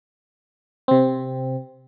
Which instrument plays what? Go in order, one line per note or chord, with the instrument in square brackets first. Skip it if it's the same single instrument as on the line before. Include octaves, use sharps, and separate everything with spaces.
[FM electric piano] C3 C4